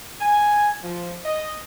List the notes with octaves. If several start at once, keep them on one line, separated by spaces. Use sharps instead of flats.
G#5
F3
D#5